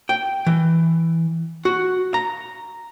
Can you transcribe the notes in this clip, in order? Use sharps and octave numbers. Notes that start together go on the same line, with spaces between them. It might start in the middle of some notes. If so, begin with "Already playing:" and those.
G5
E3
F#4
A#5